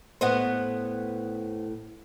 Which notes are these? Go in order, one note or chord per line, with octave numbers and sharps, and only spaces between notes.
A2 B3 C5 D#5 F#5